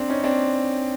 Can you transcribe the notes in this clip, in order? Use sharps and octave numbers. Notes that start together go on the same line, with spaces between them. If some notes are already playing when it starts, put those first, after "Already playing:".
Already playing: C4 D4
C#4 D#4
C4 D4